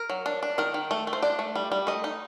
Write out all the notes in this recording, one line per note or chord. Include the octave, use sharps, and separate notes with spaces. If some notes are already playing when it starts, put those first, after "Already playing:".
Already playing: A#4
F#3
D4
D4
D#3 A#4
D#3
A3
A3
C5
D4 D5
A3
G3
G3
A3 D#5
D#4